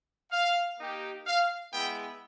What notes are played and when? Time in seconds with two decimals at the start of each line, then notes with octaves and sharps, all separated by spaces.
0.32 F5
0.79 A#3 D#4 G4
1.27 F5
1.73 G#3 B3 E4 G5